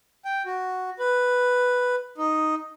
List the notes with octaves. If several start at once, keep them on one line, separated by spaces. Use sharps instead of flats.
G5
F#4
B4
D#4